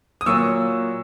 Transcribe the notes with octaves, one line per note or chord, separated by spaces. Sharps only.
D#6
A#2 F#3 A#3 C#6 E6